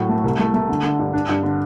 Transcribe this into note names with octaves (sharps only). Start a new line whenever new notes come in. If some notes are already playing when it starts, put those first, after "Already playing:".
Already playing: A2 F#3
A3
C2
A3
A3
D3
D3
G2
D4
G2
D3